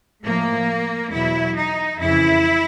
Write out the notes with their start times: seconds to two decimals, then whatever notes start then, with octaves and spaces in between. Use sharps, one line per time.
0.24 A2 F3 A#3
1.12 E2 B2 F#3 E4
1.56 D#4
1.99 F2 C#3 E3 E4